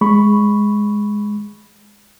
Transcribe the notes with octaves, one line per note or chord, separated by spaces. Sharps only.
G#3 B5 C#6